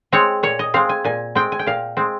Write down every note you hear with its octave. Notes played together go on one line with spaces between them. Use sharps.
G#3 C4 C#5
A#2 C#5
D#5
G#3 C4 F5
G#5
A#2 G#5
G#3 C4 G5
G#5
G5
A#2 F5
G#3 C4